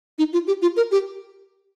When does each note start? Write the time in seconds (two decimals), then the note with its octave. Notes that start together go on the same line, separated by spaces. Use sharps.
0.19 D#4
0.33 F4
0.47 G4
0.62 F4
0.77 A#4
0.91 G4